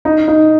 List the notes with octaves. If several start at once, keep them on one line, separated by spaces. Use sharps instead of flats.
D#4
D#4